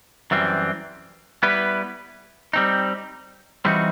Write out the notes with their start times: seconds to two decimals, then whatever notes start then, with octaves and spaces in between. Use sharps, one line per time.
0.31 F#2 E3 G3 C4
1.43 G3 B3 E4 B4
2.53 G3 C4 D#4
3.65 E3 G3 C4 D#4 F#4